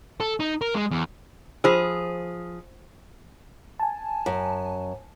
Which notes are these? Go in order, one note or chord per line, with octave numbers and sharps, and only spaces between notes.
A4
D#4
A#4
G#3
E2
F3 F4 G#4 C5 E6
G#5 A5
F#2